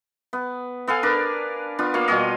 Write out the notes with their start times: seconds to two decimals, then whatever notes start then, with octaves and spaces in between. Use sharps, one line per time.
0.33 B3
0.87 B3 A4 F5 G#5
1.03 D4 A#4 B4 D5
1.79 B3 D4 F4
1.94 A#3 F4 C#5 F5
2.08 B2 G3 C#5 D#5